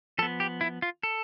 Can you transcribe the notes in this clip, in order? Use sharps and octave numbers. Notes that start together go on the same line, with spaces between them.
F3 B3 A4
G4
E4
F4
A4